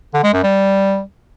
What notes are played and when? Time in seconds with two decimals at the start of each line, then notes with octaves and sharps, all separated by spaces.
0.14 D3
0.24 G#3
0.34 F#2
0.43 G3